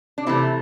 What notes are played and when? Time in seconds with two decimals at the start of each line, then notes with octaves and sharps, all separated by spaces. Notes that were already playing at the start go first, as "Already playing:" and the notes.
0.18 D4
0.27 C3 E3 A3 E4